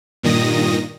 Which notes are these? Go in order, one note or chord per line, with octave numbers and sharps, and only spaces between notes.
G2 A#2 D#3 D#6 A#6